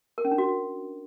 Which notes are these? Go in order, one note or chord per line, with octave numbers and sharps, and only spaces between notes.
A#4
C#4
D4
F#4